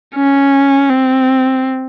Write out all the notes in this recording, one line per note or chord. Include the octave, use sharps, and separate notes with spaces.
C#4
C4